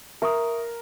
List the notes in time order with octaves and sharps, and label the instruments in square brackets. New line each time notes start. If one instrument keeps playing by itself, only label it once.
[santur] A#4 [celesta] E5 C#6 D#6